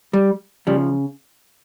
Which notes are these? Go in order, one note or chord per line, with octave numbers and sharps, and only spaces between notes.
G3
C#3 F3 G3